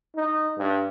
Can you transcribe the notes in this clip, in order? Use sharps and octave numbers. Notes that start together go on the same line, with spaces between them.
D#4
G2